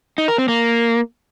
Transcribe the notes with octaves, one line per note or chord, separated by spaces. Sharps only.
D#4
A#4
C4
A#3